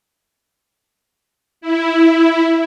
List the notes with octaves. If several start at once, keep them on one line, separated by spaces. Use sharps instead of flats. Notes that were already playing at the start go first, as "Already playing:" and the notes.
E4